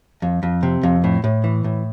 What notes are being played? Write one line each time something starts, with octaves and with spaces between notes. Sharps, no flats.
F2
F2
C3
F2
A2
A2
E3
A2